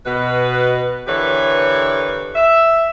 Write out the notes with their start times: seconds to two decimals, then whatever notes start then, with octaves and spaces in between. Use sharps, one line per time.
0.06 B2 B4
1.07 D3 E3 G4 A#4 B4 C#5
2.35 E5